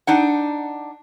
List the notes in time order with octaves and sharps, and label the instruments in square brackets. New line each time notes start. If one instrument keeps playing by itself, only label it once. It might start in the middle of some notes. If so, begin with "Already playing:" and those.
[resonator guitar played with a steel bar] D4 D#4 F#5